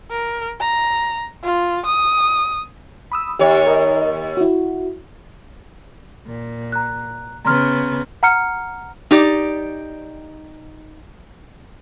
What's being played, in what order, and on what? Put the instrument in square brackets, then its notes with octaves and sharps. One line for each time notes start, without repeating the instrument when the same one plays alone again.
[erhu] A#4
A#5
F4
D#6
[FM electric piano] B5 D#6 E6
[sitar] D#2 C#5 [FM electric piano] G4
[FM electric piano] A#4 D#5
E4 F#4
[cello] A#2
[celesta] A#5 F#6
[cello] C#3 B3 [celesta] A#5 C6 F6
[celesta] F#5 A#5 F6 C#7
[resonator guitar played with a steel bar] D#4 G4 D5